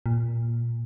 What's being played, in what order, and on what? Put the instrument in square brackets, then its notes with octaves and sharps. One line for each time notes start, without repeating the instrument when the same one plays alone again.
[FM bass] A#2